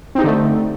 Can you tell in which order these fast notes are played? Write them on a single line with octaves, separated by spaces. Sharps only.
C4 D#4 G4 D3 A3